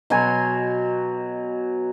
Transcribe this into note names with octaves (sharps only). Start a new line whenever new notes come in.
B2 F#3 G#5 C6